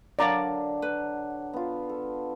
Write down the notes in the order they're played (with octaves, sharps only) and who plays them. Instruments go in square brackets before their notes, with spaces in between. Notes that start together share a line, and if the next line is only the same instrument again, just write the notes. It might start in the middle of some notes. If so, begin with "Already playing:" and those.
[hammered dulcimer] D3 F#3 D4 [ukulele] A#4 F5 A5 [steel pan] D5 A#5
[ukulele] B4
[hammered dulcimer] B3 F4
A4